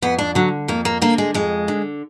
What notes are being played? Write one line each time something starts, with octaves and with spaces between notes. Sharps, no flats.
F2 B3
D4
D3 F#3
F2 A#3
A#3
D3 A#3
G#3
F2 G#3
D3